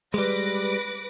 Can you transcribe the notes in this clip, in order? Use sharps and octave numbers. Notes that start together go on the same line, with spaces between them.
G3 G#3 B4 D6 A#6